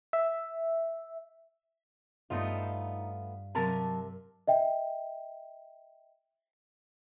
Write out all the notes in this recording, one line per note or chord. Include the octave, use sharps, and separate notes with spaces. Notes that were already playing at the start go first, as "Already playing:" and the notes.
E5
G2 A3 B3 D#4 F4 F5
C3 F#3 A#4 A5
D#5 E5 G5